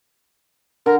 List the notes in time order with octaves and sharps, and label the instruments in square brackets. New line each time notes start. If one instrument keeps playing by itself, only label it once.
[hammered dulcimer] D3 [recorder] A#4